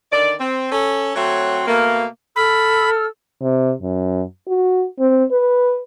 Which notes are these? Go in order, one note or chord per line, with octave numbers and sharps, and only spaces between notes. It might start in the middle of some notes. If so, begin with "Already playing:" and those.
D3 D#3 D5
C4
C#4 A4
F#3 A3 C4 F#4 C#5
B2 A3 A#3
A4 B5 E6 F6
C3
F#2
F#4
C4
B4